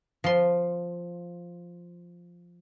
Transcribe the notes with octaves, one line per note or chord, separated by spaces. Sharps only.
F3 C6